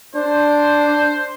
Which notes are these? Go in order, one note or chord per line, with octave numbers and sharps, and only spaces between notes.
D4 C5